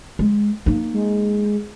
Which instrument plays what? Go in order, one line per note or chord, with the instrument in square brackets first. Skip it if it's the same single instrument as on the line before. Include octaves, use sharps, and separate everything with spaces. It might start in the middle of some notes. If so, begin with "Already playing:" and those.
[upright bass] G#3
A#3 D#4
[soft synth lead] G#3